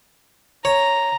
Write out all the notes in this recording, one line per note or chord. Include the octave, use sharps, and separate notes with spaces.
C#5 A#5